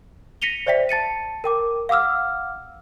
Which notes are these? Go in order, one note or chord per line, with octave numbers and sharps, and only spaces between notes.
A#6 B6 C#7 D#7 F7 G7
C5 D5 E5 G5 B6
A5 A6 C#7 D#7
A#4 G5 D6
F5 F#5 D6 E6 F6